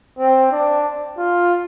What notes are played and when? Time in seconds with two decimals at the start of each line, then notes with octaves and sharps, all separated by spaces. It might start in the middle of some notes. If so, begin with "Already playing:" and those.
0.18 C4
0.51 D4
1.18 F4